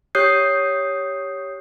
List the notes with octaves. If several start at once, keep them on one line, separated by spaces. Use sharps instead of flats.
G4 C#5 D#6 F#6 G6 C7